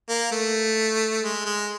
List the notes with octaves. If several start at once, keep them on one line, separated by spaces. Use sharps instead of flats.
A#3
A3
G#3
G#3